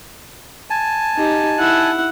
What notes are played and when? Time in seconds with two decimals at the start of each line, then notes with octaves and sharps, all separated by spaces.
0.70 G#5 A5
1.17 D#4 G4
1.59 E4 F#5